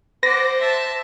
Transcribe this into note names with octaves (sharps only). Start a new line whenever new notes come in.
C5 D5 F#5 A#6
E5 A5